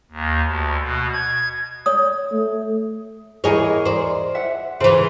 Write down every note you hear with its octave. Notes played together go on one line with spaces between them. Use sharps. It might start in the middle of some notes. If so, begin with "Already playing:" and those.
D#2
D2
B2
G#6
C#5 D#6
A3
E2 E4 G#4 A#4 C#5 D#5
C5 D5
E5 F#5
C#3 E3 C5